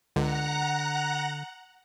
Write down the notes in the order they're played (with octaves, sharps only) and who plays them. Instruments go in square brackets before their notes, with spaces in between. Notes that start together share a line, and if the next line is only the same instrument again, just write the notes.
[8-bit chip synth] C#2 [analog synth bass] D3 [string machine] F#5 A#5 F#6